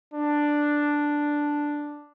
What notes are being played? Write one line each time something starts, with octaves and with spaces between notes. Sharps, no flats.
D4